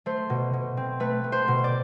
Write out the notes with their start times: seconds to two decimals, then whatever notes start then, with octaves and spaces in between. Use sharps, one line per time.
0.06 A3 C5
0.30 B2
0.53 B2
0.77 C4
1.00 A3 B4
1.24 A3
1.32 C5
1.48 B2
1.64 D5